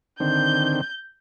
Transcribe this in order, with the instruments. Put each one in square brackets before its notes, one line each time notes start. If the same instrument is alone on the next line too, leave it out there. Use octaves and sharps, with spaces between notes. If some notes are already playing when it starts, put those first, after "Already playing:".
[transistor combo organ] D3 D#3 C4 [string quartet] G6